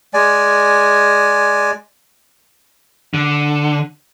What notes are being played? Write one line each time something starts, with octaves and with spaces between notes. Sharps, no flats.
G#3 D5 G#5
D3